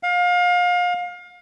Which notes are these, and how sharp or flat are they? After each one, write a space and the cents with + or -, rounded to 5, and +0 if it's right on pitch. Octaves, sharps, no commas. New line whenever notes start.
F5 +30